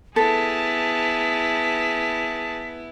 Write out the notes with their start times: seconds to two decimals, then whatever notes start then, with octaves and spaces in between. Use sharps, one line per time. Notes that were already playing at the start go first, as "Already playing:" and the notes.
0.16 B3 E4 G#4 A4 A5 B6